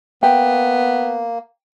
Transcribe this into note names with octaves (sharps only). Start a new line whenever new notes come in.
A#3 B3 G5